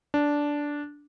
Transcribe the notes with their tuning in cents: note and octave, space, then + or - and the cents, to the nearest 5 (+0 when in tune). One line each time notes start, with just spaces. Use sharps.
D4 -10